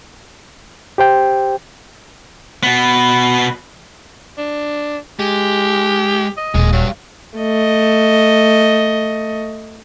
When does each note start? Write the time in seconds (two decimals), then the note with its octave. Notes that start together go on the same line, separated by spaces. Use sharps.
0.98 G4 C5 G5
2.63 B2 B3
4.38 D4
5.19 G#3 G4
6.37 D#5
6.55 D#1 D#2 G#3
6.72 G2 F#3
7.38 A3 D#5